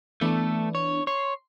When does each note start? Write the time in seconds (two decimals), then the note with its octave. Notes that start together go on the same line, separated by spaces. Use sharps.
0.21 E3 A3 B3 D4 A4
0.75 C#5
1.07 C#5 C6